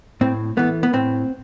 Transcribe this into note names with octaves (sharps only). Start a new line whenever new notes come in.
A2 C4
E3 A3 B3
B3
A2 C4